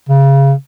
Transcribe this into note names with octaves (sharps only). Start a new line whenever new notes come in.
C#3